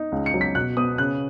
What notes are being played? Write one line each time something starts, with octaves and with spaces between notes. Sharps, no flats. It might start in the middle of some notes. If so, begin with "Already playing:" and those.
Already playing: D#4
C#2
C#7
F#3
B6
B2 F#6
B3 D#6
C#3 F#6